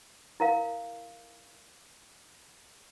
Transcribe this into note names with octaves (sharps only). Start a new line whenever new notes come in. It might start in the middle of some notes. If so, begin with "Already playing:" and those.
E4 A#4 F5